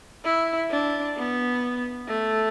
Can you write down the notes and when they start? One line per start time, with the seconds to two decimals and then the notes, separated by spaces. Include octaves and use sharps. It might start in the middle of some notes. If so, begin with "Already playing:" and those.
0.25 E4
0.70 D4
1.16 B3
2.07 A3